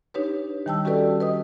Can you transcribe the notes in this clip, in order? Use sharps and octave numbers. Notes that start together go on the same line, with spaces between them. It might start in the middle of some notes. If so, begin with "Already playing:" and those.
D4 D#4 G4 B4 C#5
D#3 G3 G5 A5 E6
C#4 F#4 G4 A4 B4 D5
B4 D#5 D#6